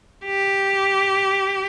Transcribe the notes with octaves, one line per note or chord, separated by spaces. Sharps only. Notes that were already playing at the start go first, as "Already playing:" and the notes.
G4